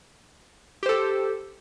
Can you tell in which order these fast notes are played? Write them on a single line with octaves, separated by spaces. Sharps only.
G4 C5 A4